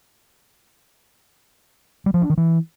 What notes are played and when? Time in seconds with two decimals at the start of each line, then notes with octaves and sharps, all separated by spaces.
2.06 G3
2.14 F3
2.22 D4
2.30 D#3
2.37 E3